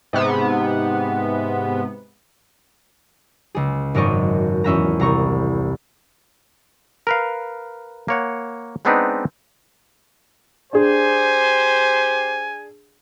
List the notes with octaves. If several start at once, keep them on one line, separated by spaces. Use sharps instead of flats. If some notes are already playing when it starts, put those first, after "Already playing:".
G#2 C3 B3
C#2 G#4
G#1 F#2 A#4 D5 D#5 C#6
E2 C#4 E5 A#5
C2 A#5 C#6
A#4 B4 F5
A#3 C#5 F#5
G#3 B3 C4 D4 D#4 B4
D4 G4 G#4 C5 G#5